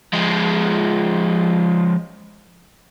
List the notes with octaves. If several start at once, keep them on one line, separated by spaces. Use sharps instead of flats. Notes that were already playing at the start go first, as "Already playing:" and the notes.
F3 G#3